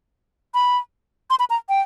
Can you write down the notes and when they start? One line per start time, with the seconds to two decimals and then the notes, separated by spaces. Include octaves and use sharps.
0.54 B5
1.30 C6
1.40 B5
1.50 A#5
1.69 G5